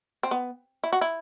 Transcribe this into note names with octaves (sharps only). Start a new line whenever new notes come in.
C4
B3
E4
F#4
E4